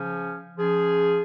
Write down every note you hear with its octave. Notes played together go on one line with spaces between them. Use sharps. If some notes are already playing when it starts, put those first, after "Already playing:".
Already playing: C#3 F3 C#4
F3 C#4 G#4